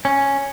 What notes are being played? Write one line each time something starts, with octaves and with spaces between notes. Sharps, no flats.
C#4